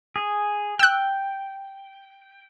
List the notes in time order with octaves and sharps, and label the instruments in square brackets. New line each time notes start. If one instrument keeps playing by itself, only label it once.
[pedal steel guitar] G#4
[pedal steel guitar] G5 [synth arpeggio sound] E6 F#6